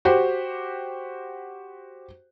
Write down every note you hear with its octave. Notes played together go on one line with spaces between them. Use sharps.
F#4 G4 C5